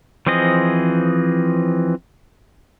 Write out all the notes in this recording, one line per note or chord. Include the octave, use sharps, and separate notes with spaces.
E3 F3 C4 G#4 D#5